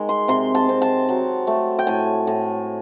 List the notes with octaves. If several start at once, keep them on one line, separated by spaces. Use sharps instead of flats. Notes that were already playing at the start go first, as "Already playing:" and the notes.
Already playing: D#3 G#3
C6
C3 C6
A5
C4
A5
F#3
A3
G5
A2 G#5
A2